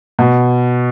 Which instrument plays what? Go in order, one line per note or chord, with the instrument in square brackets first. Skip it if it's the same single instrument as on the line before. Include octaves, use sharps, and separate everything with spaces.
[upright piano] B2